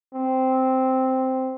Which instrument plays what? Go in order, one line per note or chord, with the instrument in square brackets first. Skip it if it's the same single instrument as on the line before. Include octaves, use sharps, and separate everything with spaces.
[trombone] C4